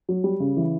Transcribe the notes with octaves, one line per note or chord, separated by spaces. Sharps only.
F#3
G3
C#3
E3